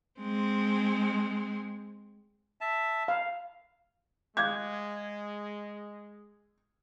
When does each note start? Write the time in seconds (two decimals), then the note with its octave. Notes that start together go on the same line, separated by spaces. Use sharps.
0.20 G#3 C4
2.61 E5 A5
3.08 F5
4.37 G#3 F5 D6 F#6 G#6